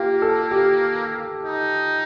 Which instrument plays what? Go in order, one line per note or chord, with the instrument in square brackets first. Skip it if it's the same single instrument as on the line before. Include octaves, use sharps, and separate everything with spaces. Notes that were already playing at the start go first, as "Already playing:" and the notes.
Already playing: [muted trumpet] A#3 [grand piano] F4 G4
[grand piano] A4
G4
[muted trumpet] D#4